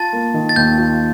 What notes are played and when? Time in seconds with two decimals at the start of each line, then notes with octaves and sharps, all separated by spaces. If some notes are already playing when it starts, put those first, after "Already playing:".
Already playing: F4 A5 A6
0.13 A#3
0.34 D#3
0.49 A6
0.56 D#2 G6
0.78 F4